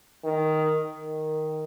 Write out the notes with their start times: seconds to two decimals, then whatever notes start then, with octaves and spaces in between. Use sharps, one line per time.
0.25 D#3
0.90 D#3